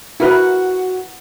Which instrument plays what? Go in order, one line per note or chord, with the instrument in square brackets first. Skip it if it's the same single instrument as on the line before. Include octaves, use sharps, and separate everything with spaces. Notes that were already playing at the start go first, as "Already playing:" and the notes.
[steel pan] E4 A#4 B4 [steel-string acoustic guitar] F#4